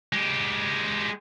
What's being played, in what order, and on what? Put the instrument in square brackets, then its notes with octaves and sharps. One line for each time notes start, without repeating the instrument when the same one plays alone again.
[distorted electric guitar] G#3 G4